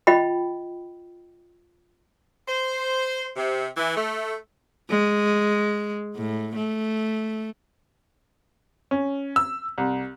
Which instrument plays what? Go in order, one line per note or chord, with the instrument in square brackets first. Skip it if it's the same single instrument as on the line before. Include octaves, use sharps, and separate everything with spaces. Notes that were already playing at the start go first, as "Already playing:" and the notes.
[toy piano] F4 D#5 G5 B5
[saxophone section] C5
C3
E3
A3
[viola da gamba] G#3
A2
A3
[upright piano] C#4
E6
C2